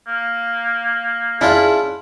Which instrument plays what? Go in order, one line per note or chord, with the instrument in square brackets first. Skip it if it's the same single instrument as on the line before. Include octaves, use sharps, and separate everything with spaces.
[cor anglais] A#3
[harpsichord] C#4 D4 F4 [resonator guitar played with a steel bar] E4 [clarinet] G#4